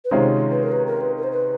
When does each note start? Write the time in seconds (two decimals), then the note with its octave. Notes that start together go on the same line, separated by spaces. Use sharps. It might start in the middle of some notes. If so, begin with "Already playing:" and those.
0.05 B4
0.10 C3 D#3 G#3 C#4 F4 C5
0.51 B4
0.63 A#4
0.72 B4
0.87 A#4
1.01 B4
1.17 A#4
1.23 C5
1.31 B4